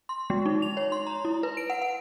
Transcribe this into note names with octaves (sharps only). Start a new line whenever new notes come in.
C6
G#3
D#4
F7
C#5
C6
A#5
E4
B4
D7
F#5
F#5